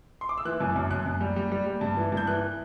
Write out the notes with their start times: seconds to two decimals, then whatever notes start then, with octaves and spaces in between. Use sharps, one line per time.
0.21 C6
0.29 D6
0.38 E6
0.45 E3 F#6
0.60 F#2
0.76 F#2
0.91 F#2 F#6
1.06 F#2
1.21 G3
1.36 G3
1.52 G3
1.66 G3
1.81 G2
1.97 E3
2.12 G2 G6
2.27 E3 F#6